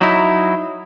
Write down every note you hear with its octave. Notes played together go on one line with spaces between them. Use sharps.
F#3 D#4 E4